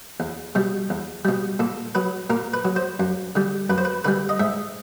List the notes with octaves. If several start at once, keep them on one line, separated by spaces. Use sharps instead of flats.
E2
B2 G3
E2
B2 G3
A#2 A4
F#3 B4
A#2 A#4
B4
F#3
C5
F#2
D3 G3
F#2 B4
C5
B4
D3 G3 B4
D#5
G#2 E5